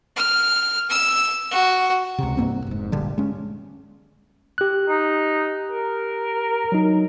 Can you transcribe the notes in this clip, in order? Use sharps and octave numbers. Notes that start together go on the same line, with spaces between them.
F6
E6
F#4
C#2 C3
C2 G2 A#3 C4
F1 G#2
A#1 G2 D3 G3
G#3 C#4
G4 F#6
D#4
A#4
F#3 D#4